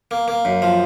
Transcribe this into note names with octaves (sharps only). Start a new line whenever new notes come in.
A#3
A#3
F#2
F3